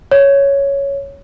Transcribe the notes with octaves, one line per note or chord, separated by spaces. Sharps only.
C#5